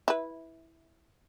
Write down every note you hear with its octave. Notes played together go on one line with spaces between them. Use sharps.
E4 B4